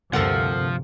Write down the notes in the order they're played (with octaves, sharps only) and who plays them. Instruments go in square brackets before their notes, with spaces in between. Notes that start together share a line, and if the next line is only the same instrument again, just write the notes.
[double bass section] D2 G2 C3 [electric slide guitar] F3 [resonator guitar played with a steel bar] A4 A#4 F#5